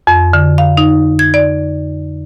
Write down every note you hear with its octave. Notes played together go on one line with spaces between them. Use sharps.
F2
D3
F5
D#4
G#6
D5